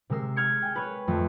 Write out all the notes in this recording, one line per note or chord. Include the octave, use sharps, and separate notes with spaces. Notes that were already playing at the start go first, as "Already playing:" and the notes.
C3 G#3 A#4 E6 C7
F6 G#6 C#7
G5 G#5
B4 C#5
F2 A3